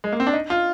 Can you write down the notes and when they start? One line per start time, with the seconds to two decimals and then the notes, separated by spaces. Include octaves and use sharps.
0.04 G#3
0.12 A#3
0.20 C4
0.27 D4
0.33 D#4
0.50 F4